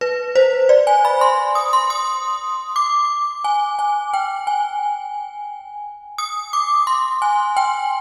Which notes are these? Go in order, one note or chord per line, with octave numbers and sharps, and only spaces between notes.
B4
C5
D5
G#5
B5
C6
D#6
C6
D#6
D6
G#5
G#5
G5
G#5
D#6
D6
C6
G#5
G5